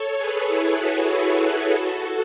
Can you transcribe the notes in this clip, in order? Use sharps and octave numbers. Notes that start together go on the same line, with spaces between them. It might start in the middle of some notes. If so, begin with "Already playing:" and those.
Already playing: A4 C#5
G#4 B4
E4 G#4
F#4 A4
F#4 A4